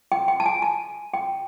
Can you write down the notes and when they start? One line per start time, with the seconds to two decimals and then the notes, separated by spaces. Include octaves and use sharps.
0.12 G5
0.28 G5
0.40 A5
0.46 G#5
0.62 A5
1.14 G5